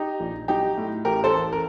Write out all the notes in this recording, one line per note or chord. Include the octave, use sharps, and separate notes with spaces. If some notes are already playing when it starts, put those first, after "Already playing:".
Already playing: D#4 G4
A#1
F#3 D#4 G4
A2
A1 G4 A#4
A4 C5
A1
A#4